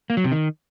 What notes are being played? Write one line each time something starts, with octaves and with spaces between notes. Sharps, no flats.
A#3
F#3
C3
D#3